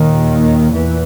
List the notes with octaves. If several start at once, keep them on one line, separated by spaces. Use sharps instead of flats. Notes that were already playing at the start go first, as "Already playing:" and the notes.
Already playing: D#2 A#2 D#3
E2 E3